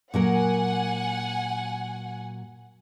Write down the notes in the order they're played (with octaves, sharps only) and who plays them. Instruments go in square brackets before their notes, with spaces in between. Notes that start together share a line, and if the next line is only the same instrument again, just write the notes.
[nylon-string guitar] A#2 F#3 A#4 [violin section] F#5 G#5